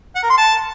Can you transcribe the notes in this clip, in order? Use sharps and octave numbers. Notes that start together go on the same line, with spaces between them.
F#5
A#4
C6
A5